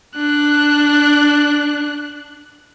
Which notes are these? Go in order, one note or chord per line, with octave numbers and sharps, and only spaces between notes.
D4 F#6